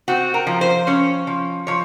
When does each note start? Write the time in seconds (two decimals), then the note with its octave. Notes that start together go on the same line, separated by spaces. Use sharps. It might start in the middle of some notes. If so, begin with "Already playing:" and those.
0.08 C4 F#4
0.34 A#4
0.47 F3
0.61 C5
0.87 C#4 C#5
1.27 F3
1.67 F3 C#5